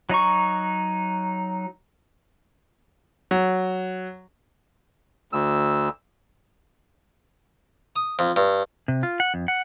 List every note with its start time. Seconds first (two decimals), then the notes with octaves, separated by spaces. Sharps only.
0.09 F#3 D#4 A#5 C#6
3.31 F#3
5.33 D2 E6
7.96 D#6
8.19 F2
8.36 G2
8.88 C3
9.03 F4
9.20 F#5
9.34 F2
9.48 F#5